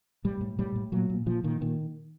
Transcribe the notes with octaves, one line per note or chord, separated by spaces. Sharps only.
A2 G3
A2
A2 G3
A2
A#2 F#3
A#2
A#2 F3
A#2 D#3
A#2 D#3